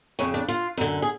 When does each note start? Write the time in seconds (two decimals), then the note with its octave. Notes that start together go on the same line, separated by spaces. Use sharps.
0.19 F2 C#3 C#4
0.34 D4
0.48 F4
0.77 F#2 D3
1.02 G#4